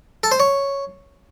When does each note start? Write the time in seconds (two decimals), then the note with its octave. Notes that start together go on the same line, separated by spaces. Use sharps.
0.23 A4
0.32 C5
0.40 C#5